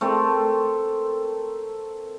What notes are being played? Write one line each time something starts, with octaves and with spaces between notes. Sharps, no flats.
A3 C4 A4 A#4